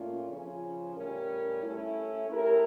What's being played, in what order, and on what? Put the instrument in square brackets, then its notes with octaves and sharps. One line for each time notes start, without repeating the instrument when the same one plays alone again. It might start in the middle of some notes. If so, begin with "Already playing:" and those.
Already playing: [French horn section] A#2 A3 C#4 F4
C#3 F3 C#4
A2 G3 C#4 G4 A#4
A3 C#4 E4
A3 E4 G4 A#4